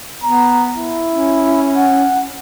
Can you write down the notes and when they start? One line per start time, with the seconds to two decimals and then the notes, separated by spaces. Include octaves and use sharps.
0.23 B3 A#5
0.77 E4
1.10 C#4
1.77 F#5